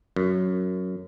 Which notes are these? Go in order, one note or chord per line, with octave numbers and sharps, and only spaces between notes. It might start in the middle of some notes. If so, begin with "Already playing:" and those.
F#2